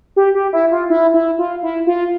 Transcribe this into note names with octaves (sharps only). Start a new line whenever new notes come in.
G4
G4
E4
F4
E4
E4
F4
E4
F4